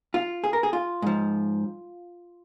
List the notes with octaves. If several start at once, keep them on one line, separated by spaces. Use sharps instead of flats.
F4
G#4
A#4
G#4
F4
G#2 F3